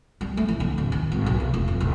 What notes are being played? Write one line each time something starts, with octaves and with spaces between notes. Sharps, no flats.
G3
A3
E3
D3
D1
D#3
G#1
B1
E2
F1
F1
D#1